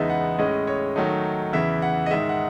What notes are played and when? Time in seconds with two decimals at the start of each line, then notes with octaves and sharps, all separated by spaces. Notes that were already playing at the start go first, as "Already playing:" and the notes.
Already playing: E2 C#3 G#3 B3 D#4 E5
0.10 F#5
0.39 A2 G#3 C#4 D#5
0.67 C#5
0.96 D#3 F#3 A3 D#4
1.53 E2 C#3 E3 E5
1.82 F#5
2.06 D#5
2.11 G#2 D#3 G#3 E5
2.29 F#5